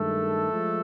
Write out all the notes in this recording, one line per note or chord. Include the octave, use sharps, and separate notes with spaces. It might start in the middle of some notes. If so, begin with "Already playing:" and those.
Already playing: G2 D#3 G#3 A3 A4
F3 G#3